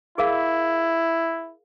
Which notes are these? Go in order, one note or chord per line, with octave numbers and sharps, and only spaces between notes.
E4 G#4 A#4 F5